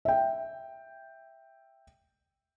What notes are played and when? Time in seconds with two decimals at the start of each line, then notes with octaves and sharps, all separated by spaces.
0.05 E5 G5